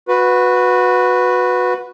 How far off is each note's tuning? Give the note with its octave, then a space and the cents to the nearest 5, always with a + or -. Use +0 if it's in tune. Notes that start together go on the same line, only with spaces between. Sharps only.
F#4 -20 B4 +0